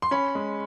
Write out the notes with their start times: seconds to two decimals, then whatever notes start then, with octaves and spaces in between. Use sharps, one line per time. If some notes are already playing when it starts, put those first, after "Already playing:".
0.02 C6
0.11 C#4 B5
0.35 G#3